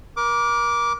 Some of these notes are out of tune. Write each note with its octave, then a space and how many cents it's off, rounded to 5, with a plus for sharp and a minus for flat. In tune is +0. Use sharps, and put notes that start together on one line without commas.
A#4 +30 D6 -10